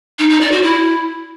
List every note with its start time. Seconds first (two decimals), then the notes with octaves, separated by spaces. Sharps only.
0.19 D#4
0.30 D#4
0.41 D5
0.51 F#4
0.62 E4